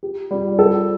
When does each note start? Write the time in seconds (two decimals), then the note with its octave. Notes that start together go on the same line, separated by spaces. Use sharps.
0.03 G4
0.31 G3
0.59 A4